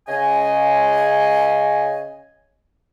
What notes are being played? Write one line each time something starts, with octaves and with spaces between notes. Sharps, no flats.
C#3 D#5 G#5